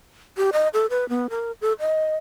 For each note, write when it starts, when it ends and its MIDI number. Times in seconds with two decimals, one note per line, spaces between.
0.37 0.50 67
0.53 0.68 75
0.74 0.86 69
0.90 1.08 71
1.09 1.27 59
1.30 1.52 70
1.61 1.73 69
1.80 2.17 75